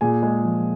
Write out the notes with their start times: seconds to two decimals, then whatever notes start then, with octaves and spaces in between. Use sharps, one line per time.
0.01 A#2 G#4 G#5
0.23 G#3
0.44 F3